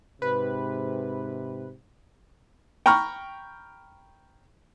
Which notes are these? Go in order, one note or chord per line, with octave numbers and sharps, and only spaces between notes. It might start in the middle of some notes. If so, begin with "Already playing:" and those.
G#2 C3 B4
G5 A#5 B5 C#6 F6